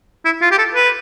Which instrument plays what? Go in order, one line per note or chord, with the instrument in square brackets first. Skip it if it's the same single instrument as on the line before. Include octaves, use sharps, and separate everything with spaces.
[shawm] E4
F4
G4
A4
B4